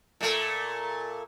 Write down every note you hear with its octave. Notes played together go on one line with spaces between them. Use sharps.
A#2 A3